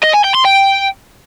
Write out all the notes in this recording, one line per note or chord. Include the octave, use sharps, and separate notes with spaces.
D#5
G#5
G5
C6
G5